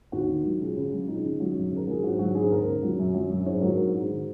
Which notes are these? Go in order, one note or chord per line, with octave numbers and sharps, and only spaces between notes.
D#2 F#4
D#3
F#3
C#2
C#3
F#3
C#2 D#4
C#3
F#3
F#2
C#3
A#4
F#3 G#4
G#2 F#4
F#3 F#4
G#2 G#4
D#2 A#4
C#3
F#3
F#2
F#3
F#2
G#2 C#5
F#3 A#4
G#2 F#4
G#2
D#3